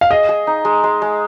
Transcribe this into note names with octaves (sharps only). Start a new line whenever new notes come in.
F5
G#4 D#5
G#4
D#4
G#3
G#3
G#3